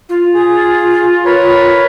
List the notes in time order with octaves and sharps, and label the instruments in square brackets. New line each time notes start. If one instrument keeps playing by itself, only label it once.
[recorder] F4
[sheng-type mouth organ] G#4
A#4 B4 C#5